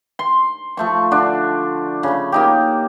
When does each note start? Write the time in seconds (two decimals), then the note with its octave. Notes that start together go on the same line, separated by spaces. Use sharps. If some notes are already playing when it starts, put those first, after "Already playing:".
0.19 C6
0.77 F3 A3 C#6
1.11 D3 D4
2.03 C#3 B5
2.32 A#3 D#4 G4